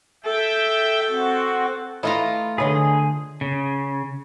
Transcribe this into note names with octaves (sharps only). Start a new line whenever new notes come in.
A4 E5 G5
C4 F#4
A3 E4 F4 B4 D#5 A#5
D3 G#4 B4 C#5 D#5
C#3